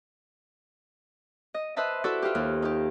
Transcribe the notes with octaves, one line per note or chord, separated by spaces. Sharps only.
D#5
B4 C5 D#5 E5 A5
E4 F#4 A4 D5 E5
F4 G4
D#2
D#4 G4